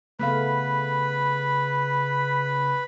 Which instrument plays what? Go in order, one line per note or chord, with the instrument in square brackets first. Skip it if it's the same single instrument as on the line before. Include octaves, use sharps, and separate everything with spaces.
[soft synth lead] C#3 [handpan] A3 B3 F5 [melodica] B4 B5